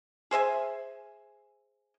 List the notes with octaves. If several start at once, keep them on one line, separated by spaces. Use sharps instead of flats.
G#4 C5 E5 G#5